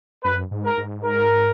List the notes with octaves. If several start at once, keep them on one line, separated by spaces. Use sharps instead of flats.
F#2 B4
G#2
A#4
G#2
A#4